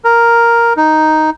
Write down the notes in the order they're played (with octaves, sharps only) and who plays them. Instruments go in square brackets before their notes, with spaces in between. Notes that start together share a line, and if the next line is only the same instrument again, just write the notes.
[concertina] A#4
D#4